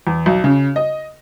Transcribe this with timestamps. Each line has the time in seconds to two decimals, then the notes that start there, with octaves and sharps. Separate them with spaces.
0.07 E2
0.26 B1
0.44 C#3
0.76 D#5